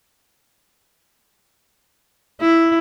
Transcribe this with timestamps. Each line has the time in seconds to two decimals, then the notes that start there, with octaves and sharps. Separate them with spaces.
2.41 E4